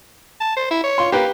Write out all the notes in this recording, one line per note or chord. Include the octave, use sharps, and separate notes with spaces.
A5
C5
E4
C#5
F4 C6
A#3 G4 B4